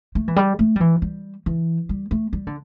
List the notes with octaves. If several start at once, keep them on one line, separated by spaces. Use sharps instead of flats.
A3
E3
G3
A3
G3
E3
G3
E3
G3
A3
G3
D3